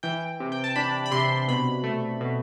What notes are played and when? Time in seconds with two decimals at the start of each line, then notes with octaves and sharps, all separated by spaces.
0.03 E3 G5
0.40 C3
0.52 G5
0.64 A5
0.76 D4 B5
1.06 B5
1.11 C3 C6
1.48 B2 B5
1.84 A3
2.21 B2